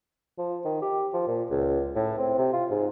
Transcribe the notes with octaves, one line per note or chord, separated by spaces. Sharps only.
F3
D#3
G4
F3
A#2
C#2
A2
C4
C3
F4
G#2